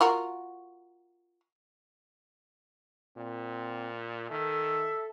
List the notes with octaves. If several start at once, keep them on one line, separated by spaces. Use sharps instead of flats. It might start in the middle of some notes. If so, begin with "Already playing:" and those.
F4 F#4 A#4
A#2 C4
D#3 A4 E5